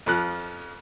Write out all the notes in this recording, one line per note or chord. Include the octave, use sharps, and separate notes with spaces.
F2 F3 F#6